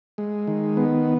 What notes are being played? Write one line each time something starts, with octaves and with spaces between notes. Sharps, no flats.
G#3
D#3
B3